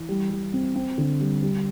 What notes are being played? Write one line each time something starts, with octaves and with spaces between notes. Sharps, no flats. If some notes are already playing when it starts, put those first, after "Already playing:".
Already playing: E3
G3
G3
C4
C4
D3
G3
G3